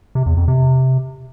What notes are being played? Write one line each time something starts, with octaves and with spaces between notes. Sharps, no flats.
C3
E2
F2
C3